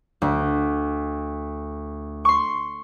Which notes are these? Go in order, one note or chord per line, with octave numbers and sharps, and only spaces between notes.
D2
C6 C#6